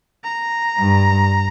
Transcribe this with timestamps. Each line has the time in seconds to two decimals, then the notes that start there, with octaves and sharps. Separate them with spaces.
0.24 A#5
0.78 G2